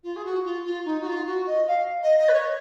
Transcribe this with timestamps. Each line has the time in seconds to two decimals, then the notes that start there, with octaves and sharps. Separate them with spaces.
0.03 F4
0.16 G#4
0.25 F#4
0.44 F4
0.64 F4
0.85 D#4
1.01 F#4
1.06 F4
1.26 F#4
1.46 D#5
1.67 F5
2.03 D#5
2.18 D#5
2.28 B4
2.33 C#5